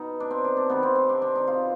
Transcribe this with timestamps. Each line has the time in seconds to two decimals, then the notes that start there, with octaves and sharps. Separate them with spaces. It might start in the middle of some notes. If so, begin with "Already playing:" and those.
Already playing: B2 D#4
0.20 D4
0.31 C4
0.44 D4
0.57 D4
0.70 C3 D#3 B3
0.83 C4
0.95 C4
1.09 D4
1.22 D4
1.36 D#4
1.47 B2 F4